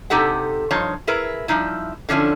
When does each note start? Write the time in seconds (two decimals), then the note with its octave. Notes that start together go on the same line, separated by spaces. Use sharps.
0.10 C3 D#4 G4 A4 F#5
0.71 G2 F3 D#4 F4 C#5
1.07 E4 G#4 A#4 B4
1.48 F3 G3 D#4 E4
2.09 D3 F3 C#4 E4